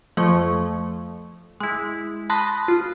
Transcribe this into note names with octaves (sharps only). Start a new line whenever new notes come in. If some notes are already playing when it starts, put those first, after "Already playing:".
F2 F3 A3 C#6
G#3 E4
A5 B5 C6 D#6 F#6 A#6
F4